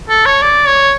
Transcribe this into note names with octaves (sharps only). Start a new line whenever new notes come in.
A4
C#5
D5
C#5